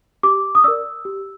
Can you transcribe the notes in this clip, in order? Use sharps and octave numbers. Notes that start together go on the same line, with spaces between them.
G4 D6
D#6
A#4 D5 E6
G4